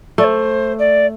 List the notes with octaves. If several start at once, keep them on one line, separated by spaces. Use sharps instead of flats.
A3 D5
C5
D5